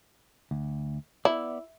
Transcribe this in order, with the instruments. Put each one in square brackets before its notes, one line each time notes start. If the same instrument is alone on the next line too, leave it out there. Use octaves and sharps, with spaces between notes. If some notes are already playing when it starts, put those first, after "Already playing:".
[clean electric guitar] D2
[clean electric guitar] B3 D5 [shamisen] E4